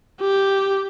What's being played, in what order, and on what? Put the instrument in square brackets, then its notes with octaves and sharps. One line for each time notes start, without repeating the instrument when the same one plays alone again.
[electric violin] G4